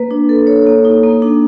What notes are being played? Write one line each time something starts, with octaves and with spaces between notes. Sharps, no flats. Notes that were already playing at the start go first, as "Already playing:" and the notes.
Already playing: A#3 B4
D4
A4
C#5
A#3
D#4
A#3
D4